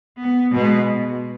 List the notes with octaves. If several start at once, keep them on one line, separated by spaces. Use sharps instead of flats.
B3
B2 G#3 B3